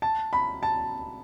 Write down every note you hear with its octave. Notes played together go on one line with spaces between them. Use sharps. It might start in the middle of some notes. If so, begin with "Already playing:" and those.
A5
B5
A5